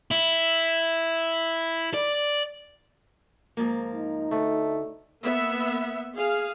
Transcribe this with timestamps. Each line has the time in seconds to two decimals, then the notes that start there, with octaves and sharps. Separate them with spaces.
0.11 E4
1.94 D5
3.57 G#2 F3 A#3
3.93 D#4
4.31 D2 A3
5.22 A#3 B3 E5
6.16 G#4 F5